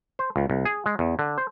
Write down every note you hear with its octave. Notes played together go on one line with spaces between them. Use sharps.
C5
C#2
C2
G#4
G#3
E2
D3
C5